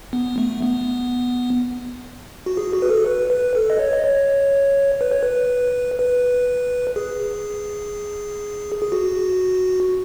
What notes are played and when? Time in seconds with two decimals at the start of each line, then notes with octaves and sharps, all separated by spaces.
0.13 B3
0.38 A3
0.62 B3
2.46 F#4
2.57 G#4
2.73 F#4
2.82 B4
2.89 A4
3.06 B4
3.30 B4
3.55 A4
3.70 D#5
3.79 C#5
3.93 D#5
4.04 C#5
5.01 B4
5.11 C#5
5.23 B4
5.99 B4
6.96 G#4
8.82 G#4
8.92 F#4